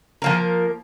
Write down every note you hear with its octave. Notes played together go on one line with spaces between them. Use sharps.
F3 A#3 A#4